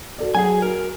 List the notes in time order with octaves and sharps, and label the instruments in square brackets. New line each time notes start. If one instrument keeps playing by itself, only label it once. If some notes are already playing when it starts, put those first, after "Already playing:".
[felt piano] F#4 A4 D5
[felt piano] F#3 F#5 [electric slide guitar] G#4 G#5
[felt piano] F#4 [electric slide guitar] A#4